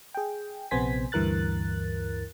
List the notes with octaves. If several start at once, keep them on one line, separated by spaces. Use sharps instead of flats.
G#4 G5
A#1 C3 B3 C5 G#5 B6
D2 G2 E3 A#4 F#6 A6